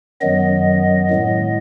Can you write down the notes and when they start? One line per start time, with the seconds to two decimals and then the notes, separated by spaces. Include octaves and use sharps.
0.21 F#2 D#3 F#3 B3 D#5
1.11 A2 G#3 B3